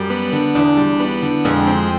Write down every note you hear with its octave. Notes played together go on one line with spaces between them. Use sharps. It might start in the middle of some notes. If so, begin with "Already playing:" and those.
Already playing: F#2 G3
B3
D3
E2 D4
G3
B3
D3
F2 G#3
C4